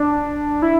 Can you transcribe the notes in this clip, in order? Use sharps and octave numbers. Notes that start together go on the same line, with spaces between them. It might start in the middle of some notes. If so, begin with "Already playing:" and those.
Already playing: D4
E4